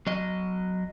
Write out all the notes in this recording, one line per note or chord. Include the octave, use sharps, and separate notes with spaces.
F#3 D#5